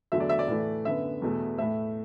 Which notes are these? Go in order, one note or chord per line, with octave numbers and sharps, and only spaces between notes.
E2 D3 F#3 A3 E5
D5
E5
D5
A2 E3 A3
F#2 D3 B3 E5
E2 B2 A3
A2 A3 E5